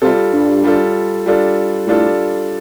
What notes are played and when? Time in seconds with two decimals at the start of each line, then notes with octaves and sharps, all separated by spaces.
0.02 C3 G3 F4 A4
0.33 G2
0.64 G3 F4 A4
1.26 G3 D4 F4 A4
1.87 A2 G3 D4 F4 A4